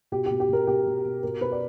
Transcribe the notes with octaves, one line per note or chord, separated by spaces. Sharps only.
B2 G4
B2 G4
G4
B2 A#4
B2 G4
B2
B2
B2 A#4
B2 B4
D5